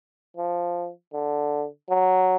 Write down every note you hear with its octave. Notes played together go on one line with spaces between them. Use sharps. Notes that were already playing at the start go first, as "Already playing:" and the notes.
F3
D3
F#3